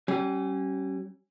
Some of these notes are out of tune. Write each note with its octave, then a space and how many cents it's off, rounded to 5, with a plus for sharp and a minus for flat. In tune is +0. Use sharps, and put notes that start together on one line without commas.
G3 -40 C#4 -15